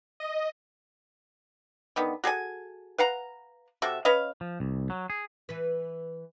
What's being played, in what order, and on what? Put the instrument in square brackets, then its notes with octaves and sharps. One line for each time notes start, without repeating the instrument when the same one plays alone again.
[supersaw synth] D#5
[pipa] D3 D#3 B3
F#4 G#4 A4 G#5
B4 F5 F#5 A#5
C3 F#4 A4 E5
C#4 B4 D#5 F5
[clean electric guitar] F3
C2
F#3
G#4
[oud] E3 B4